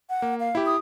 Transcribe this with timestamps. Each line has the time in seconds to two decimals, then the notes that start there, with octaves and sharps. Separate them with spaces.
0.10 F#5
0.22 A#3
0.40 F5
0.55 E4 G4
0.66 D#6